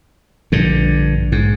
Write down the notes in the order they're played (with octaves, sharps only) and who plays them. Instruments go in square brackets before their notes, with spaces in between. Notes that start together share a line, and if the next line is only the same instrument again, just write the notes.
[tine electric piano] A#1 [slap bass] G2 D3
[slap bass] G#2